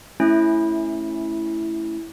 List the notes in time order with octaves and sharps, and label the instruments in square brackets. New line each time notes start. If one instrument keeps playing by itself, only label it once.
[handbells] A3 C#4 E4